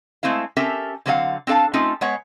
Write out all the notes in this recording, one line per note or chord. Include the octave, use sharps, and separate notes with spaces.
G#3 A3 C4 E4 F5
C4 C#4 G4 A4 A#4 E5
D3 F#3 C4 A4 F5 F#5
C4 D4 A4 F5 A5
A3 C4 C#4 D#4 F4 A4
G#3 B3 C#5 F#5